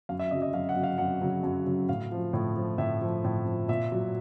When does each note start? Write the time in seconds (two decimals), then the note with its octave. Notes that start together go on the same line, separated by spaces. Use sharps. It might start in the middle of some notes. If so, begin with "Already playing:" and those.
0.09 F#2 F5
0.19 E5
0.31 C#3 F#3 D#5
0.42 D#5
0.53 F#2 F5
0.69 F#5
0.76 C#3 F#3
0.83 F5
0.98 F#2 F#5
1.22 C#3 F#3
1.43 F#2
1.66 C#3 F#3
1.89 A2 F5
2.12 F3
2.33 A2
2.57 F3
2.78 A2 E5
3.02 F3
3.24 A2
3.46 F3
3.68 A#2 E5
3.92 F#3